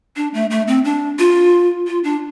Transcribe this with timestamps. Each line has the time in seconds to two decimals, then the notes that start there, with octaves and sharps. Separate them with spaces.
0.16 D4
0.34 A3
0.50 A3
0.67 C4
0.85 D4
1.19 F4
1.87 F4
2.04 D4